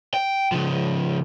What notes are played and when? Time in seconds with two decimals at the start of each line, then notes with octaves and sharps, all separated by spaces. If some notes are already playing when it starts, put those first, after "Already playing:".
0.14 G5
0.52 C#3 F3